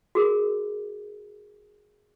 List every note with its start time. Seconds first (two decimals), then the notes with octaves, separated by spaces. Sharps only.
0.15 F#4 G#4 A#4